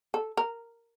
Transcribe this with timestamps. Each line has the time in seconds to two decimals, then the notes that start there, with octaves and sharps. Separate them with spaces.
0.14 A4
0.37 A#4